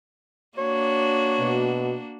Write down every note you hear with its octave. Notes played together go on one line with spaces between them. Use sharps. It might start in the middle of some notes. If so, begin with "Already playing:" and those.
A#3 D4 F#4 C#5
B2